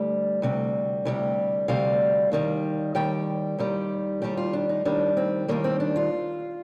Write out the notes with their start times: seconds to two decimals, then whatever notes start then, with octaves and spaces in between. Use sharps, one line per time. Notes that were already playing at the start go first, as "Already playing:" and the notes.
Already playing: D2 G3
0.42 D2 C3 G3
1.05 D2 C3 G3
1.68 D2 C3 G3 F5
2.32 D#2 D#3 G3
2.95 D#2 D#3 G3 G5
3.59 D#2 D#3 G3
4.22 D#2 D#3 G3 G4
4.37 F4
4.53 D4
4.69 D#4
4.85 D#2 D#3 G3 D4
5.17 C4
5.48 D#2 D#3 G3 A#3
5.64 C4
5.80 D4
5.96 F4